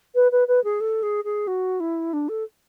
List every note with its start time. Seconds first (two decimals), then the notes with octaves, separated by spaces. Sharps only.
0.15 B4
0.32 B4
0.48 B4
0.64 G#4
0.80 A4
1.03 G#4
1.24 G#4
1.47 F#4
1.80 E4
2.13 D4
2.29 A4